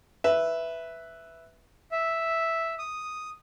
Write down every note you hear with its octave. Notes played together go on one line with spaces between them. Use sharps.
B4 E5
E5
D#6